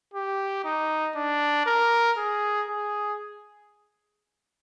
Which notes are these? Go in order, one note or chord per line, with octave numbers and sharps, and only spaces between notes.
G4
D#4
D4
A#4
G#4
G#4